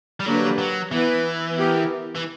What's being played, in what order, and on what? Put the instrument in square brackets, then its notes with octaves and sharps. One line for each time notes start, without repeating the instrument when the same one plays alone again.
[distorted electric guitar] G3
[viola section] D3 A#3 D4 G4 B4 [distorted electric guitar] F#3
[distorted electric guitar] F#3
[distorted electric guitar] E3 [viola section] B3 E4 B4
[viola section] B3 E4 G4 A#4
[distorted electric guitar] E3